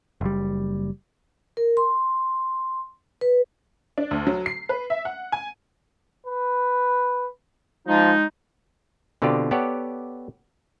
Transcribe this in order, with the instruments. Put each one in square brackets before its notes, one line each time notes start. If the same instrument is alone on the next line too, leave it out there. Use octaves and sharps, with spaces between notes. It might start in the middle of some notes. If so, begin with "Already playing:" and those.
[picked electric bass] F#1 G3
[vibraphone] A#4
C6
B4
[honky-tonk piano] D4
D2
F#3
C7
B4
E5
F#5
G#5
[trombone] B4
[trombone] F3 [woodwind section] G#3 D#4
[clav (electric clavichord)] B2 D3 C4 F4 G4 D5
B3 G4 A4 C#5 D5 F#5